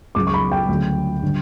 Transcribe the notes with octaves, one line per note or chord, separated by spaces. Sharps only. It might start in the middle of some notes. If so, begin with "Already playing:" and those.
C#2 C#3 F#3 D6
C#6
B5
G5
D2 C#3 F#3
D3 G3